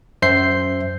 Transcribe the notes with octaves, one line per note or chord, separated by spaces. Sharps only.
F#2 C5 E5 G6 C7